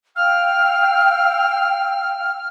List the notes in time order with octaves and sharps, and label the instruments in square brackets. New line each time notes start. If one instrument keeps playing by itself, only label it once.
[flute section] F5 G5 E6 [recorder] F6